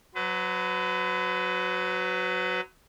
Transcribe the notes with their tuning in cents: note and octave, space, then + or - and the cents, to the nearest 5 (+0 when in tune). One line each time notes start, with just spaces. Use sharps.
F#3 -5 B4 +35